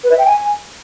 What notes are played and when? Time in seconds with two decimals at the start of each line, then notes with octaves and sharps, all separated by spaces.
0.04 B4
0.11 E5
0.19 G5
0.26 G#5